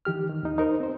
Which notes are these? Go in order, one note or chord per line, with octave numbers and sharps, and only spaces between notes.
D#3 E3 G4 F6
D#3
D#2 D#4
D#4 A#4 C5
C4 C5